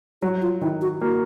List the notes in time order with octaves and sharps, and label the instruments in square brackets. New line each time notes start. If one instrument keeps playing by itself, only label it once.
[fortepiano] F#3 [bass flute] F#4
[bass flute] F4
[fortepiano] D#3 [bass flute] E4
[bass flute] F#4
[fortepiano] A#3 [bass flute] F#4